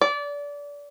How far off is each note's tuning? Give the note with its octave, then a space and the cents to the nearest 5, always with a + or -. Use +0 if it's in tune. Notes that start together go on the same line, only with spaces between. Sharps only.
D5 -25